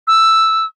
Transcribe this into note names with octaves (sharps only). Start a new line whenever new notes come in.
E6